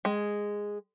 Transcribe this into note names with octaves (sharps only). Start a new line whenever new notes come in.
G#3